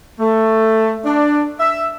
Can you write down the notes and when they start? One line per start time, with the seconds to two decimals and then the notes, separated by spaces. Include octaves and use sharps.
0.20 A3
1.05 D4
1.60 E5